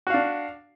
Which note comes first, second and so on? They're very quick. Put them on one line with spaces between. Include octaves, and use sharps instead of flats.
F#4 F5 D4